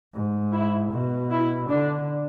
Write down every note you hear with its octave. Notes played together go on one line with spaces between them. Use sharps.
G#2
E4
B2
E4
D3 D4